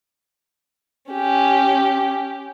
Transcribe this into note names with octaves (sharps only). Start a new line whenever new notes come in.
C#4 G4